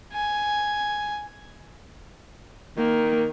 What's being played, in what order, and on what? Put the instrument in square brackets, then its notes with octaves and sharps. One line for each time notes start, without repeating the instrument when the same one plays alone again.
[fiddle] G#5
[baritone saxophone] D#3 [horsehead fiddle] A#3